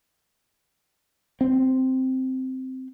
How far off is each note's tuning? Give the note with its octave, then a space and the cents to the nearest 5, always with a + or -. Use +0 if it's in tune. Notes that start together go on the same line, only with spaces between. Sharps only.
C4 -5